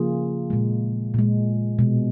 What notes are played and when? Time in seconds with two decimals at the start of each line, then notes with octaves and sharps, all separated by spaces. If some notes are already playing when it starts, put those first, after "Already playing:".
Already playing: C#3 F3 A#3 F4 G#4
0.50 A#2 G#3
1.14 A#2 G#3
1.79 B2 G#3